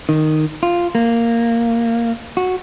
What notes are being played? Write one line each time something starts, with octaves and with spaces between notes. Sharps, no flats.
D#3
F4
A#3
F#4